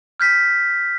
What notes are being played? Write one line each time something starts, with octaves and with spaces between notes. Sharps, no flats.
F6 G6 B6